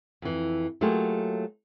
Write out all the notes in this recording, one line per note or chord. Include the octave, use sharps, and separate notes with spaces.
F2 E3
F#3 A3 A#3 F4 G4 G#4